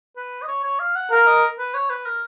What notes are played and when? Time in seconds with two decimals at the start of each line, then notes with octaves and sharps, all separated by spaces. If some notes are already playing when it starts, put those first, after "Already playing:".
0.17 B4
0.42 D#5
0.48 C#5
0.64 C#5
0.79 F5
0.95 F#5
1.12 A#4 F5
1.27 D#5
1.59 B4
1.74 C#5
1.90 B4
2.06 A#4